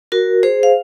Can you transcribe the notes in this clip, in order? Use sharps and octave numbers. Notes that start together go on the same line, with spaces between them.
F#4 A#4
G#4 C5
F5